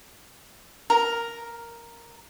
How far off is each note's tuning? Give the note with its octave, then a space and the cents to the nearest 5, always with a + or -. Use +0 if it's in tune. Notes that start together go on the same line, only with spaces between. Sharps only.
A#4 +0 A#5 +0